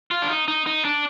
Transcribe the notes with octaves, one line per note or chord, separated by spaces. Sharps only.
F4
D4
D#4
D#4
D#4
D4